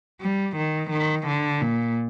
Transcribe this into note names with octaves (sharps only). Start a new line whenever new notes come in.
G3
D#3
D#3
D3
A#2